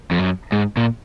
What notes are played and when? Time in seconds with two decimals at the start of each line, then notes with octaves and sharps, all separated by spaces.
0.11 F2
0.19 F#2
0.52 G#2
0.77 A#2